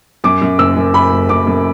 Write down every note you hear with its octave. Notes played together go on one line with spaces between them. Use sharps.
F#2 D6
F#2
F#1 E6
F#2
F#2 B5
F#1
F#2 D6
F#2